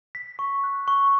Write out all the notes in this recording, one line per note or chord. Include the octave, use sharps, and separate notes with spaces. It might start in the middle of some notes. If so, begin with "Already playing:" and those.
B6
C#6
F#6
C#6